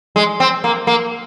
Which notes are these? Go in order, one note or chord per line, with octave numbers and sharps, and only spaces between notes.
G#3
C4
A#3
A#3